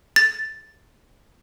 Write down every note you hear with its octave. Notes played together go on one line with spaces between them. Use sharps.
A6